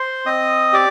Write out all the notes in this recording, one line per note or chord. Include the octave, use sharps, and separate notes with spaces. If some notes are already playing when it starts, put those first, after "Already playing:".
Already playing: C5 C6
C4 D#5 D#6
G4 D5 D6